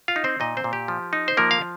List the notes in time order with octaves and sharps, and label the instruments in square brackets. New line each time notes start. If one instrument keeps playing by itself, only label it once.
[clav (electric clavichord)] F4 F5
D#4
C4 C5
A#2 D#4 D#5
C4 C5
A#2
G4
F3
D#4
C5
F3 A#3 A#4
F5